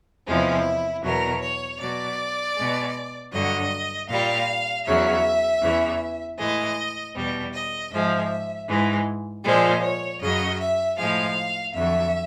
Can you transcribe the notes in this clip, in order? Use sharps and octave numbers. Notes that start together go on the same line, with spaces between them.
E2 C3 F3 G#3 E4
E2 B2 F#3 A#4
C#5
B2 F#3 D5
B2 G#3
G2 D3 F#3 D#5
A#2 G3 F5
E2 C#3 F#3 E5
E2 C#3 E3
A2 E3 G#3 D#5
E2 B2 G3
D#5
G#2 F3 G#3 E5
G#2 E3 G#3
A#2 F3 G#3 C5
C#5
F#2 C#3 F#3 D#5
E5
A2 F3 G#3 F5
F2 D3 F#3 E5